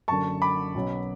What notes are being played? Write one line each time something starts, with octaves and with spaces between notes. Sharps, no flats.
F#1 F#2 D3 A5 C#6
B5 D6
B1 B2 F#3 C#4